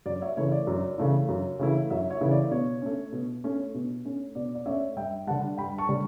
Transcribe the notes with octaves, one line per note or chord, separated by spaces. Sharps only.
F#2 D5
C#5 E5
C#3 E3 A3 E4 C#5
D5
F#2
C#3 E3 A3 E4
F#2
C#3 E3 A3 E4
F#2 C#5 E5
C#5 E5
C#3 E3 A3 E4
D5
B2 C#5
A3 C#4
B2
A3 C#4
B2
A3 C#4
B2 D5
D5
A3 C#4 C#5 E5
G2 E5 G5
D3 G3 F#5 A5
G2 G5 B5
A5 C#6
D3 G3